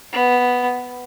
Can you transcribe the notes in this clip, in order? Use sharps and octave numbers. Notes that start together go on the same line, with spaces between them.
B3